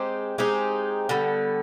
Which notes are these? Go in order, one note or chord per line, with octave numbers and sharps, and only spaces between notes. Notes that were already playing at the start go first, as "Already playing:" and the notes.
Already playing: G#3 C4 D#4 G4
G#3 C4 D#4 G4
D3 G3 B3